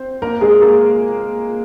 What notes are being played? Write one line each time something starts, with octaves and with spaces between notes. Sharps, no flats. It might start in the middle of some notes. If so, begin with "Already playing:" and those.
Already playing: C4 C5
A#3 A#4
G#3 G#4
A#3 A#4